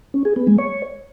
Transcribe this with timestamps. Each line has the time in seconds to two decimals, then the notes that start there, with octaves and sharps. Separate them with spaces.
0.14 C#4
0.25 G#4
0.36 B3
0.47 G#3
0.58 C#5